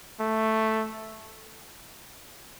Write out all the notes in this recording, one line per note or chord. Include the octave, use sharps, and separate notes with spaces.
A3